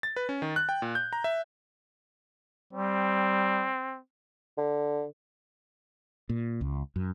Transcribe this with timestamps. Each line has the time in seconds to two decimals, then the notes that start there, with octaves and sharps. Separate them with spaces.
0.03 A6
0.16 B4
0.29 C#4
0.42 D#3
0.56 F#6
0.69 G5
0.82 A#2
0.95 G6
1.13 A#5
1.24 E5
2.73 G3 C4
4.58 D3
6.29 A#2
6.61 C#2
6.96 F#2